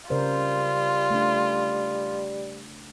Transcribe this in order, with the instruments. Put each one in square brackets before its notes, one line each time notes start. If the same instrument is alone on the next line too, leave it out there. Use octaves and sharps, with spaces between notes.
[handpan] C#3 A#4 C5 [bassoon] G3 [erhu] F4
[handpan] A3 D4